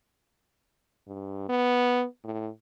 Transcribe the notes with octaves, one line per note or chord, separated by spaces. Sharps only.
G2
B3
A2